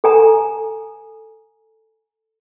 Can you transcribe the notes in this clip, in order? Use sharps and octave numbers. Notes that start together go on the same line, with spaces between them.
A4 G#5 A#5